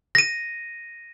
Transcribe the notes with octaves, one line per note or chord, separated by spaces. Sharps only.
A#6 D#7